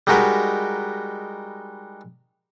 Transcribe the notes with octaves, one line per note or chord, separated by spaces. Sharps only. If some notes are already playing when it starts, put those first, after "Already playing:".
G3 G#3 D#4 F#4 A#4 B4